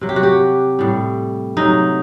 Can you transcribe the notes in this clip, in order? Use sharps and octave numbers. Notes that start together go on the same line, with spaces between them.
C3 F#3
G4
F#4
G4
A2 G3
C3 F#3 D#4